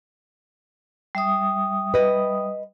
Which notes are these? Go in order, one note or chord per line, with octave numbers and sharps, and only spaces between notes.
G3 E5 D#6
B4 D#5